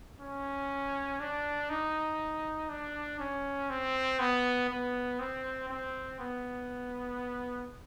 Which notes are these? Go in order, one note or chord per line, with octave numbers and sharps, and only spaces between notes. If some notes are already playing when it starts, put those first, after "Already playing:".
C#4
D4
D#4
D4
C#4
C4
B3
B3
C4
C4
B3